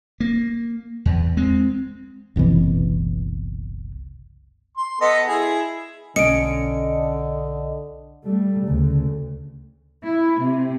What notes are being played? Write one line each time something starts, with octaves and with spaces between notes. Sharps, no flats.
A#3
E2
G#3 C4
F#1 C2 B2 E3
C6
B3 A4 D#5
E4 G#4
B1 D3 C#4 D#5 C#7 D7
G3 A3
D2 C#3
E4
C3